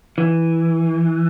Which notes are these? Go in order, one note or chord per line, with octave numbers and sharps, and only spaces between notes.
E3